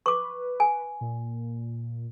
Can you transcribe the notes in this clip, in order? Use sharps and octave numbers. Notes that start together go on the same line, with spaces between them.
B4 C#6 D6
G#5
A#2